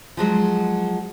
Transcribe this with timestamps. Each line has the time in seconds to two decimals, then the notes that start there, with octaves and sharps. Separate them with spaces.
0.17 F3 F#3 G#3